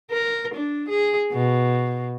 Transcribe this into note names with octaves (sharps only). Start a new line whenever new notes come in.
A#4
D4
G#4
B2